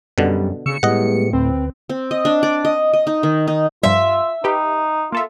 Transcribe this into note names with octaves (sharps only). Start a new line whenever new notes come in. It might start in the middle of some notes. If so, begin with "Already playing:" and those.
F#2 B2 D3 G3
C#3 C#6 E6 C#7
A2 G3 G#3 B3 D#5 F#5
D2 C4 B4
C4
D#5
D4
D5
D#5
D#5
D#4
D#3
D#4
G2 F3 G3 F4 E5
D#4 G4 B4
A#3 F4 A4 E5